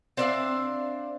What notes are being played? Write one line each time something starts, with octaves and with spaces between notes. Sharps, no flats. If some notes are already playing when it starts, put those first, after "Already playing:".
C4 D4 E5 F5